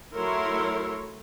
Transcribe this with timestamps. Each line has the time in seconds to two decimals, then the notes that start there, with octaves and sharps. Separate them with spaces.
0.15 F#3 A3 E4 A#4 C#5 C6